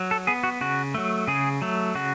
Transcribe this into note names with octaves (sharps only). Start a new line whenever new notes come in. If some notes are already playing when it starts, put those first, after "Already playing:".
Already playing: F#3
A4
B3 G#4
F#4
C#3 F#4
F#3 A3
C#3 G#4
F#3 A3
C#3 F#4